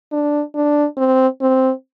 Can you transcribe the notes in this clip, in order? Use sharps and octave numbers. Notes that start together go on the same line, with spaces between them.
D4
D4
C4
C4